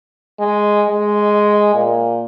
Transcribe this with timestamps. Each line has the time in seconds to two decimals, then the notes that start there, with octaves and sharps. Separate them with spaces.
0.40 G#3
0.90 G#3
1.74 A#2